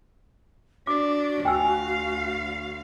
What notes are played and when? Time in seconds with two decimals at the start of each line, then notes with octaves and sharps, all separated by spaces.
0.87 D4 F#4 D6
1.45 D2 F5 G5 G#5 E6